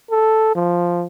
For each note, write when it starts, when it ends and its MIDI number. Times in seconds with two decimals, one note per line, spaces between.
0.11 0.50 69
0.55 1.05 53